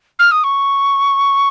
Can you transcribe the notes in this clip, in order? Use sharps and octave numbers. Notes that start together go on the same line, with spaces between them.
F6
D#6
C#6